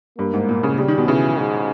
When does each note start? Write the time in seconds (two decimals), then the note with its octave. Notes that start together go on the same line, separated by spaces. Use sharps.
0.18 G2 A#3
0.34 G#2
0.49 A#2
0.63 C#3
0.78 C#3 G3
0.88 D#3
0.98 B2
1.08 C#3 E3
1.38 G#2